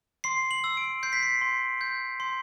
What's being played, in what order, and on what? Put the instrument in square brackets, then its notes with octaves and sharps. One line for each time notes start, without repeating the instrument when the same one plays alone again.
[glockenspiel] C6 C7
F#7
E6
D7
G6 C7
B6
C7
C6
G6
C6